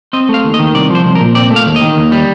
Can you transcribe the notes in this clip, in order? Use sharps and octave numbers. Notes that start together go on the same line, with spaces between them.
C4 D#5
A3
F5
D#2
D#5
D#3
C2 D5
F3 C5
C2
A#4
A#2
C4 D5
A3
F5
D#2
D#5
D#3
D#2
G3